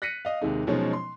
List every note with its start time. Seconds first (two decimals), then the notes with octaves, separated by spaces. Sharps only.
0.02 F#6 A#6 B6 C#7 D#7
0.25 D#5 F5
0.41 D#2 C3 G#3 D#4
0.67 B2 F3 F#3 G#3 C#4 D#4
0.93 C6